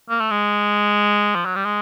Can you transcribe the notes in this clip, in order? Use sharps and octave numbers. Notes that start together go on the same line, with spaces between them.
A#3
A3
G#3
F3
F#3
G3
G#3